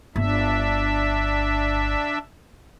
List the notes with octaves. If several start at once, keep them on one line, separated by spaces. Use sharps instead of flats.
G1 D4 E5